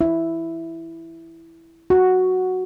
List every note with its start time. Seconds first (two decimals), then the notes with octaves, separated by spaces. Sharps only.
0.01 E4
1.90 F#4